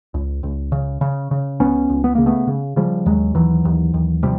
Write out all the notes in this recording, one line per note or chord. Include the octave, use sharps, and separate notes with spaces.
C#2
C#2
C#3
C#3
C#3
C#2 B3 C#4
C#2
B3
C#3 A#3
A3 B3
C#3
C#3 F3 G3
D#2 F#3 G#3
D#2 E3 F#3
D#2
D#2
C3 F3 G3